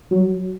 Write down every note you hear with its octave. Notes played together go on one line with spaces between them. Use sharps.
F#3